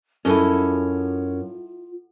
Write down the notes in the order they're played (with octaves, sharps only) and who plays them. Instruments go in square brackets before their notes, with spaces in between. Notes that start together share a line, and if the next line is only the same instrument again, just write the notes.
[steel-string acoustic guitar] F#2 [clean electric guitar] C#4 [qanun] E4 A4 D#5 [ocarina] F4